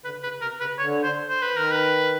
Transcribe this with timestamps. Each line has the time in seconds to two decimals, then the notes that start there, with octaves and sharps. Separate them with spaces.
0.05 D3 B4
0.22 C#3 B4
0.41 C3 A#4
0.60 C#3 B4
0.79 D3 C#5
1.04 C5
1.29 C5
1.42 B4
1.54 D#3 A#4
1.71 B4